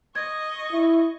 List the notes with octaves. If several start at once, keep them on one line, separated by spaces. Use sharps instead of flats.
D#5 C#6 G#6
E4